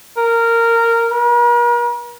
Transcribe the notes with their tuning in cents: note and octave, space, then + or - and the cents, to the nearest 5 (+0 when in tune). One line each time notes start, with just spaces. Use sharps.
A#4 -15
A#4 +45